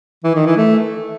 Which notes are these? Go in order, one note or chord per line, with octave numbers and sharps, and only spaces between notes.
E3
D#3
E3
A3